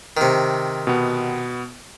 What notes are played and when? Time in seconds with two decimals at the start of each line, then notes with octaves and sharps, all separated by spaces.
0.17 C3 D#3
0.87 B2 B3